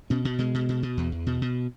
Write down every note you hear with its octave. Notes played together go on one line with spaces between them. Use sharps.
B2 C#4
B2
B2 G#3
B2
B2
B2
E2
E2
B2
B2